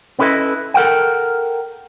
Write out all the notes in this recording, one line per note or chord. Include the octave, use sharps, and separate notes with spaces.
B3 C#4 E4 A4 B4 D#5
A4 A#4 F#5 G5